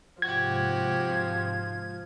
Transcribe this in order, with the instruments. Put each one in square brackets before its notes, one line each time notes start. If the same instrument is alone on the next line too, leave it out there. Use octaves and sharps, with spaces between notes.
[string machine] G#2 C3 [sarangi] F3 [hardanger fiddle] F#4 G4 [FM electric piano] G#6